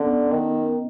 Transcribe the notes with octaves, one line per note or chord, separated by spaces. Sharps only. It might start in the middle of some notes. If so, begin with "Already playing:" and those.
Already playing: D3 B3 C#4
D#3